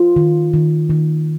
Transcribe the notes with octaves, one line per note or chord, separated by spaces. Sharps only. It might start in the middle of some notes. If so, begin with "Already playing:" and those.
Already playing: F4
D#3
D#3
D#3